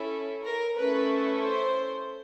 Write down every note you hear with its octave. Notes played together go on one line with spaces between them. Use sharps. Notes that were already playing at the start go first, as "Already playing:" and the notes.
Already playing: C#4 E4 A4
A#4
A3 C#4 E4 A4 B4
C5